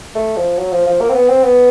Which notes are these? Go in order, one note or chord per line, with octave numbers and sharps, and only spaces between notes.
A3
F3
F#3
F3
F3
A#3
C4
B3
C4
B3